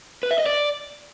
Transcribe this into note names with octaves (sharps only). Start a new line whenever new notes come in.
B4
E5
D#5
D5